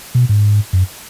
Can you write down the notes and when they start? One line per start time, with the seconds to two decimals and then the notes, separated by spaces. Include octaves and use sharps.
0.15 B2
0.29 G#2
0.73 F#2